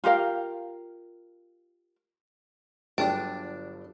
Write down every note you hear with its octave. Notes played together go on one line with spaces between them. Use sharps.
F4 G4 A#4 F5
G1 G2 F#3 D4 G#4 D5 G5 A5